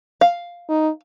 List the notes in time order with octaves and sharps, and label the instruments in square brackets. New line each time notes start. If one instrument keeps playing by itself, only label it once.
[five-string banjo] F5
[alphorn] D#4